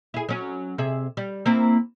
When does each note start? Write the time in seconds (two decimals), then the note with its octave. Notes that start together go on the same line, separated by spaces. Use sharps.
0.14 E4 G#4
0.29 F#3 C#4
0.78 C3 G#4 E5
1.17 G3
1.46 A#3 C4 E4